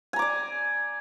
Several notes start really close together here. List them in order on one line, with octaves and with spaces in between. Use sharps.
G#5 A#5 D6 D5